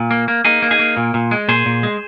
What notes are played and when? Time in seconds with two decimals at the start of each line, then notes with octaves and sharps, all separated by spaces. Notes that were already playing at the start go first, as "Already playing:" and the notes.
Already playing: A#2
0.11 A#3
0.28 A#3
0.45 A#3 D#4 G#4
0.62 A#3
0.71 D#4 G#4
0.79 A#3
0.97 A#2
1.14 A#2
1.31 G#3
1.48 A#2 G#4 C5
1.66 A#2
1.83 G#3